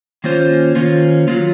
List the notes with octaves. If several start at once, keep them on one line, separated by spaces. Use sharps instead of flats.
D#3 A#3 C#4 F4 C5
D#3 A#3 C#4 F4 C5
D#3 F#3 A#3 F4